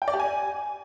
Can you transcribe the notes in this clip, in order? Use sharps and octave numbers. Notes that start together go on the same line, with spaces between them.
G5
D5
G4
G#5